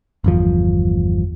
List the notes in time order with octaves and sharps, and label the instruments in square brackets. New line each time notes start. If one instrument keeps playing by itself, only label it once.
[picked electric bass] G1 E2 F3